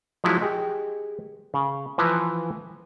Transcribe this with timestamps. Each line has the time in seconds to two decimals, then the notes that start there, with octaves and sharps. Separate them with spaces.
0.24 F3 F#3 G#3 E4 F#4
0.41 G4 G#4 D#5
1.54 C#3
1.98 E3 F3 B4 E5 G#5 A#5